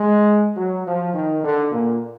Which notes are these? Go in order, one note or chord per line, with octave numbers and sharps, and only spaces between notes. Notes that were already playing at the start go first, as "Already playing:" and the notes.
Already playing: G#3
F#3
F3
D#3
D3
A#2